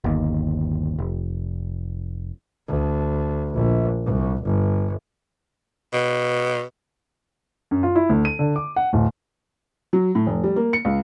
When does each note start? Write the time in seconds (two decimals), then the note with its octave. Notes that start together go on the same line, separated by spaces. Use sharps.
0.04 G1 D#2
0.99 F1
2.68 D2
3.54 A#1
4.05 C2
4.43 G1
5.93 B2
7.71 F#2
7.83 F4
7.96 E4
8.09 D2
8.25 D#7
8.39 D3
8.56 D6
8.76 F#5
8.93 D1
9.93 F#3
10.15 A2
10.26 F1
10.44 G3
10.56 A#3
10.73 C#7
10.85 C#2